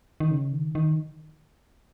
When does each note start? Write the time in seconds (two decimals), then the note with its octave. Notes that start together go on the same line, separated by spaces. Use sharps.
0.20 D#3
0.31 C#3
0.52 D#3
0.75 D#3